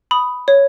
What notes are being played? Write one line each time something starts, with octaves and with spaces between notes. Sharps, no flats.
B5 D#6
C#5